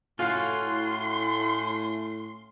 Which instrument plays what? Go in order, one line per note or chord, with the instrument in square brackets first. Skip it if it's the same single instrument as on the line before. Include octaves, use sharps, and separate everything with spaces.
[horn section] A2 [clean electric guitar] C#4 F#4 F5 [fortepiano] F4 [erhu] C6